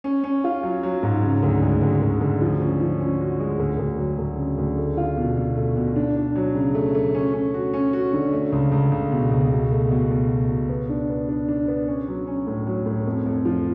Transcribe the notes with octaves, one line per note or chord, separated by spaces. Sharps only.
C#4
C#4
F4
F#3
F#3
G#2
C#3
D2
G#3
D2
D2
D2
F3
C#4
F3
C#4
F#4
G#3
D2
D2
F#3
D2
C#3
D2
A3
F4
B2
B2
A3
B2
D4
D4
F#3
C#3
A3
A3
C#4
C#4
F#4
C#4
F#4
D3
A3
C#2
C#2
C#2
B2
C#2
B2
A3
B2
B2
B2
B2
B3
D4
B3
D4
D4
B3
C#4
F#3
C#4
A2
F#3
A2
F2
F2
F3